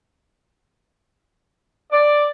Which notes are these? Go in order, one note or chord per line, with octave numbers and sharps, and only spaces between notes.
D5